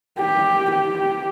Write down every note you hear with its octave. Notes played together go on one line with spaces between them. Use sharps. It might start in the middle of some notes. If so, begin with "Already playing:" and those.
G4
G4